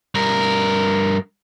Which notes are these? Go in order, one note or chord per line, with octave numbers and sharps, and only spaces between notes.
G2 A#4